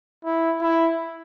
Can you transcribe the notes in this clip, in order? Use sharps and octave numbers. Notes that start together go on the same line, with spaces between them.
E4
E4